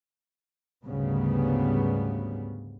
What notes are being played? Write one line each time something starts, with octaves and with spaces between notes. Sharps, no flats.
D2 G#2 C#3 G3 B3